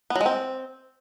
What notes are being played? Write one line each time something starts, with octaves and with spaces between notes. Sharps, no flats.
B3
F#3
G#3
C4